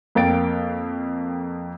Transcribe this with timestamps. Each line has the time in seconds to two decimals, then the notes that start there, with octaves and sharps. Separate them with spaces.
0.15 F2 A#3 F5 G5 A6 D7